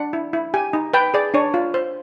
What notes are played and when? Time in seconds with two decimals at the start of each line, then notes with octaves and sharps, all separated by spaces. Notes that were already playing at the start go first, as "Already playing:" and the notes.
Already playing: D4 F#5
0.13 E4
0.33 E4
0.54 G4 G#5
0.73 D#4
0.94 B4 G5
1.14 G#4 D5
1.34 D4 C#5
1.54 F4
1.74 C5